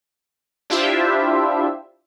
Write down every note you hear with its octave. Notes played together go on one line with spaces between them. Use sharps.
D4 E4 F4 G4 C5 E5